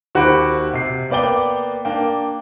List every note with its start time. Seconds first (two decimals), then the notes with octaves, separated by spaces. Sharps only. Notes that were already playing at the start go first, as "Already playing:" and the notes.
0.15 D#2 F#4 G4 C5 B5 D7
0.73 C3 C7
1.10 A#3 B3 D5 G5 G7
1.85 A#3 D4 G5